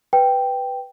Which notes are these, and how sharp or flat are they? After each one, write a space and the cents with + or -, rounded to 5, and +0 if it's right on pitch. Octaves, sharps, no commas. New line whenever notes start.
B4 +0 G5 +0